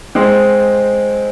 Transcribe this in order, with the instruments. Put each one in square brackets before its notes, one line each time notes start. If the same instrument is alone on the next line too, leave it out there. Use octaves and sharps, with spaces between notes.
[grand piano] G#3 C4